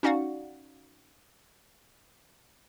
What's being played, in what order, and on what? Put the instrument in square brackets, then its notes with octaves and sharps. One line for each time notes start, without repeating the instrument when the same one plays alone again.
[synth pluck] C#4 D#4 F#4 D5 F5 F#5